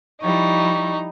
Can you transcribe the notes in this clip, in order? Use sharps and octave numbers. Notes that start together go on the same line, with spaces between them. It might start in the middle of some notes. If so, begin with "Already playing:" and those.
F3 G3 D#4 E4 C#6